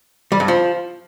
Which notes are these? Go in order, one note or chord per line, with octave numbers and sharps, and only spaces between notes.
G3
G2
F3